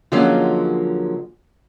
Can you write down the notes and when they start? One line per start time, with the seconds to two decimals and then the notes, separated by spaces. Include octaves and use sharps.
0.12 D3 F3 F#3 G#3 A#3 C#4